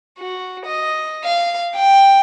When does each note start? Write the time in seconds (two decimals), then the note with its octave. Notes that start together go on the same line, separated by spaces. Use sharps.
0.19 F#4
0.66 D#5
1.24 F5
1.76 G5